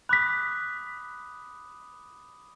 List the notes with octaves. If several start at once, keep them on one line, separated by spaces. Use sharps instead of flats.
B5 D6 D#6 F#6 B6